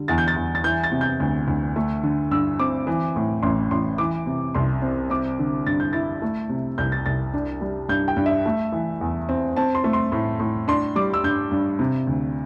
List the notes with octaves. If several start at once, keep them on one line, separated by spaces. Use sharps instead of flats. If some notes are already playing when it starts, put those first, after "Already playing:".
Already playing: D3 G3
E2 A6
G6
A6
E2
A6
E3 G6
A6
C3
G6
D2
D2
A3
D3
G2 E6
C4 D6
E3
A2
A1 C6
A1 C6
E3 D6
C3
C2 C6
C4
C4 D6
D3
G2 A6
G6
E4 A6
A3
C3
C2 G6
A6
C2 A6
D4
G3
G2 G6
G5
G2
E5
A3
E3
E2
C4
C4 A5
C6
A3
C6
A2
A2
D4 C6
G3 D6
E6
G2 G6
G2
C3
D2